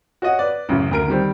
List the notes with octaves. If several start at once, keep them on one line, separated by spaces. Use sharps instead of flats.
F#4 C#5 D#5 F#5
B4 D5
A1 F#2 C#3
D2 A#4 D7
D#3 G3 C4